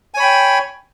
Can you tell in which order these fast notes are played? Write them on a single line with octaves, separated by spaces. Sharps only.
G#5 C#5 B5 G5